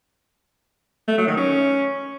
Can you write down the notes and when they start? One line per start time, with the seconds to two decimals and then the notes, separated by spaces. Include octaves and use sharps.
1.08 A3
1.18 F#3
1.27 D#3
1.37 C#4